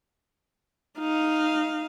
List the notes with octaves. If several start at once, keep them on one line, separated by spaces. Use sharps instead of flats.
D#4 F5